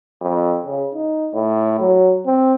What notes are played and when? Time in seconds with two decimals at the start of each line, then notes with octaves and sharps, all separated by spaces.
0.21 F2
0.65 C#3
0.94 D#4
1.34 A2
1.80 F#3
2.26 C4